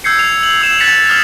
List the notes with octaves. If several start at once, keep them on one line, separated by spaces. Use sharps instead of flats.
E6 G6 G#6 C7 C#7
F7
F#7
E6 E7 F7
F#6 A6 B6 C#7 E7 F7
D#6 F6 A6 F7